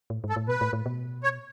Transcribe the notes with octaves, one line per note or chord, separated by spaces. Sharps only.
A2
G#2
A4
A2
B2 B4
A2
A2
B2
C#5